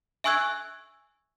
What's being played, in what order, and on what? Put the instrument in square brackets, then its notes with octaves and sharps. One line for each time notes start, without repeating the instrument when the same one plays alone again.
[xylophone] E5 G#5 C#6 E6 F#6 G#6